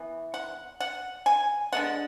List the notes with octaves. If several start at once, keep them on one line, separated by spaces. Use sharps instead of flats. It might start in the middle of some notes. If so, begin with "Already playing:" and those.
Already playing: E3 B3
F#5
F#5
G#5
D3 G#3 B3 F#5